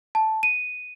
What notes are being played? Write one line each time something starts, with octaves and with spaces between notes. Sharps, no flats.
A5
D#7